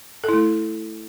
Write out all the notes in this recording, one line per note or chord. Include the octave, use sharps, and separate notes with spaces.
A3 E4 A4